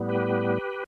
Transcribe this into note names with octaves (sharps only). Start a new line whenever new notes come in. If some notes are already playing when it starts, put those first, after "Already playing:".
Already playing: A2 G3 B3
G4 B4